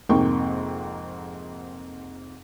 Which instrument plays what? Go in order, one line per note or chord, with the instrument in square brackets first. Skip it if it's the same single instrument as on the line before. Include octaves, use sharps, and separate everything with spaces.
[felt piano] F2 G#2 C3 A#3 G5 C#6